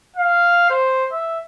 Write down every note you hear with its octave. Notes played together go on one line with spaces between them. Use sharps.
F5
C5
E5